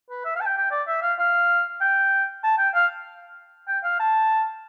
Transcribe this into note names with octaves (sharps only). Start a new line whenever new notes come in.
B4
E5
F5
A5
G5
G5
D5
E5
F5
F5
G5
A5
G5
F5
G5
F5
A5